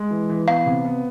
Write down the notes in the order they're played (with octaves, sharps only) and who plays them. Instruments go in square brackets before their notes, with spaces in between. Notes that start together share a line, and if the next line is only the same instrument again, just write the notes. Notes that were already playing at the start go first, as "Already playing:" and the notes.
Already playing: [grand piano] G#3
E3
E3
[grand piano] B3 [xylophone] F5
[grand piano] C3
B3